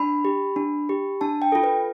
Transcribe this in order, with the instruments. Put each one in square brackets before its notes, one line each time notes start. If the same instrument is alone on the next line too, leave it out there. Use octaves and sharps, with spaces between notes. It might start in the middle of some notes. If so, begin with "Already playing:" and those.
Already playing: [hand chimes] D4 B5
G4
D4
G4
D4 A5
G5
F4 A4
B4